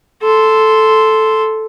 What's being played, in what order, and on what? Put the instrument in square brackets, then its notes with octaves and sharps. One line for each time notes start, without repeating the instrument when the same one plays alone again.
[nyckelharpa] A4 C6